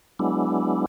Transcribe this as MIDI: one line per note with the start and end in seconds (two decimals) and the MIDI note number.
0.19 0.86 54
0.19 0.86 56
0.19 0.86 59
0.19 0.86 62
0.19 0.86 64